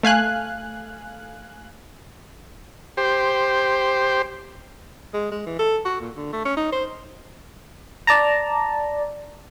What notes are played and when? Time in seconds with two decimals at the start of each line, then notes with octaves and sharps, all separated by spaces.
0.03 A3 F5 G#5 F#6
2.97 G4 C5
5.14 G#3
5.31 G#3
5.46 E3
5.59 A4
5.85 F#4
6.00 A#2
6.16 D3
6.32 A3
6.45 C#4
6.57 D#4
6.72 C5
8.07 D5 A5 A#5